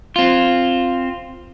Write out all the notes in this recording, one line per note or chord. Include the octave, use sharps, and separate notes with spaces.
C4 F4